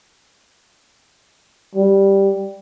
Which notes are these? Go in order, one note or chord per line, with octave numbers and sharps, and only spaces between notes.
G3